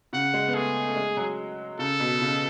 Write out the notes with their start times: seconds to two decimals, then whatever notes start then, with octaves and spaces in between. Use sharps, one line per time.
0.13 C#3 F#5
0.33 G#3
0.48 B3
0.55 A3 G#4
0.88 A3
0.96 G#3
1.17 F#3
1.79 C#3 A4
2.00 B2
2.22 C#3